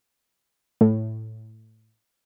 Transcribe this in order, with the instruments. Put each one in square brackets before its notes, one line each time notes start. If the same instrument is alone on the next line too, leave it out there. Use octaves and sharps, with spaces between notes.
[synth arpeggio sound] A2